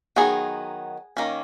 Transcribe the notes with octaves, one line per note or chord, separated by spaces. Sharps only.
D#3 F#3 B3 D#4 G#4
D#3 A#3 C#4